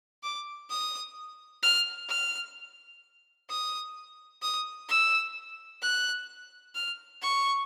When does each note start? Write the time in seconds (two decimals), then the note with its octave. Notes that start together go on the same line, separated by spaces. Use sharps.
0.23 D6
0.70 D#6
1.63 F6
2.09 F6
3.49 D#6
4.42 D#6
4.89 E6
5.82 F#6
6.75 F6
7.22 C#6